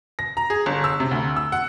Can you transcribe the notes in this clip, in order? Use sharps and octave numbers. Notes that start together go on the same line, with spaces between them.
A#6
A#5
G#4
G1
E6
C3
D2
E6
F#5